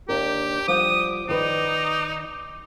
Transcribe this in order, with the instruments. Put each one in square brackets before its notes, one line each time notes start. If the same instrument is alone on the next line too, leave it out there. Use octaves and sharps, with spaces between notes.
[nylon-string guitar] D#2 D4 A#4 [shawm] G4
[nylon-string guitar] F3 G3 F#5 [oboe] D6 [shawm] D#6
[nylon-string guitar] D#3 B4 D5 [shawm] D#4